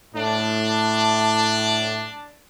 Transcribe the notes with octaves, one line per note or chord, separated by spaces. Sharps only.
A2 D4